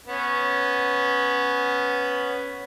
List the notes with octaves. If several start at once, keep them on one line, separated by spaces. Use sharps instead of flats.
B3 C#4